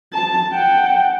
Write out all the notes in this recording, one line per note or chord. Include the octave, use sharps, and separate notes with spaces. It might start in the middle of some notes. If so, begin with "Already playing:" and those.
A5
F#5 G5